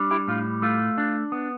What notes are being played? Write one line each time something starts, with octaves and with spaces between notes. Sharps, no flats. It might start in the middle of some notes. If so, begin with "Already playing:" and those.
Already playing: G3 D4
E4 G4
A2 F4
A3 F4
D4
B3